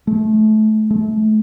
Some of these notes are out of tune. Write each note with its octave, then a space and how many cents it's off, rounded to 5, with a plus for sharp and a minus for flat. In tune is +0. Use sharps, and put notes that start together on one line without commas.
A3 -25
A3 -30